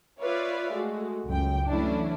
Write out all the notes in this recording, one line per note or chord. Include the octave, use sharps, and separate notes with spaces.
F4 B4 C#5 D5 E5 F5
G#3 A3 F#4
C#2 F#2 G5
E3 F#3 A3 C#4 D4 E4